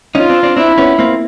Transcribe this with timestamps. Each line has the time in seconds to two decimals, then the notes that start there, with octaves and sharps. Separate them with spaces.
0.15 C#4 D#4 F4
0.29 C4 D4
0.43 C4 D4
0.57 C4 D4 E4
0.78 B3 C#4
0.99 A#3 C4